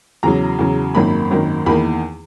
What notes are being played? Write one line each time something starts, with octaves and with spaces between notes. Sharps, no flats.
E2 C#3 F#3 A#5
E2 C#3 F#3
G#1 F#2 D#3 A#3 B5
G#1 F#2 D#3 A#3
E2 D#3 A#3 B5